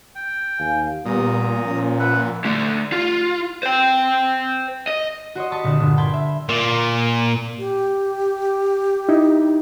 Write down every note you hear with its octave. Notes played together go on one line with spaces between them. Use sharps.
G5
D#2 F5 G#5
A#2 G3 B3 A#5 D#6
F3 C#4
B4 E5 F#5
D3 A3
F4
C5 G5
D#5
F#4 C5 C#5 D#5
D#5 A5 B5 C#6 D#6 B6
C2 A#2 D3 A#4 D5 E7
G1 D3 F#4
G5 A5 B5 C6 G6 G#6
E5
A#2
G4
D#4 E4